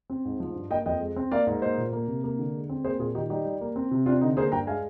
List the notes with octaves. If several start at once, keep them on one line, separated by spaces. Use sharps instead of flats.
C4
G#2
F3
G2
A#3 D#5 G5
F2 D#5 G5
G#3
C4
A#3 D5 F5
G#2
A#3 C5 D#5
A#2
A#3
C3
A#3
D3
G#3
C4
A#3 G#4 C5
A#2 F4 G#4
D#3 D#4 G4
G3 D#4 G4
G3
A#3
C4
C3
C4 D4 F4
D3 D#4
A#3 G#4 C5
G2 G5 A#5
G#3 F5 G#5